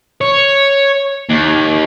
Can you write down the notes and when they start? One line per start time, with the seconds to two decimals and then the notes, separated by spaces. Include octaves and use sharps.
0.21 C#5
1.29 D#2